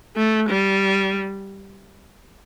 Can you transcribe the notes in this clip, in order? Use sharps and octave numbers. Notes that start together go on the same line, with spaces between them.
A3
G3